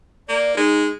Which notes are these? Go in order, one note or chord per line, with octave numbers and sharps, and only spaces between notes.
A#3 D5
G#3 D#4